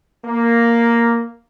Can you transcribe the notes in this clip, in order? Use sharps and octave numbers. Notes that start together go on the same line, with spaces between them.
A#3